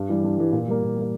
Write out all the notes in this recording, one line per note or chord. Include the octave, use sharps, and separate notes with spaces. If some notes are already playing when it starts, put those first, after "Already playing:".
Already playing: G2
E3 G3
G2
E3 G3
A#2
G3 A#3
A#2
G3 A#3